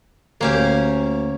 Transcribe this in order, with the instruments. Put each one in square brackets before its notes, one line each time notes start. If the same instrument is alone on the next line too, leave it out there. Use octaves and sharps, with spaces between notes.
[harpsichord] D2 F5 [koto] A#3 C#4 G4